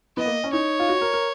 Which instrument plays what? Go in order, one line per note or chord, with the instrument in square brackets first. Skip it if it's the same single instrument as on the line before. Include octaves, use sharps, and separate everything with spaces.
[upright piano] B3 [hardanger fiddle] D#5
[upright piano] A#3
C#4
[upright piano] D#4 [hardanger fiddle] C#5
[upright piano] F4
F#4
A#4
A#4